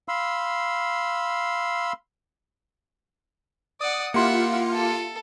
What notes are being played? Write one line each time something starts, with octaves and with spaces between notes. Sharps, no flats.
F5 B5 C6 E6
D5 F#5 D#6
A#3 E4 F4 G4 F#5 C6 C#7
A4